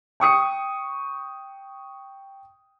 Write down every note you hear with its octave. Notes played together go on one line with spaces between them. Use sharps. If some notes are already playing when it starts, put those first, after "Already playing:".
G5 C#6 D#6 C#7